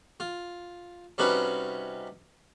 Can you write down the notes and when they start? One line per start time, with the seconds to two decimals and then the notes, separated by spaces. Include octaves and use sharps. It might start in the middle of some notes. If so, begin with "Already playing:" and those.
0.20 F4
1.18 C3 G3 C#4 D#4 F#4 B4